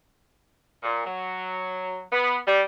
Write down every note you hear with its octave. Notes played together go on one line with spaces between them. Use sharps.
A#2
F#3
B3
G3